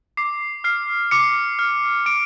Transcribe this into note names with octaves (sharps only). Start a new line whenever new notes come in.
D6 C7
F6 C7
D6 C#7
F6
D6 D7